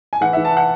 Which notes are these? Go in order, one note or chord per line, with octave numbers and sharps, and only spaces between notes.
G#5
E3 F#5
E3 E5
A5
F#5